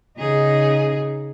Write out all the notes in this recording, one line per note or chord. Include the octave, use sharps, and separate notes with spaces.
C#3 D#4 G#4